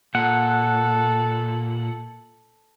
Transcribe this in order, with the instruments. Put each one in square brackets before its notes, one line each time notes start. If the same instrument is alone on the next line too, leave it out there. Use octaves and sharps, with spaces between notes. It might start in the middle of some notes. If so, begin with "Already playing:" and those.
[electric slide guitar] A#2 [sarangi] A4 [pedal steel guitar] F#5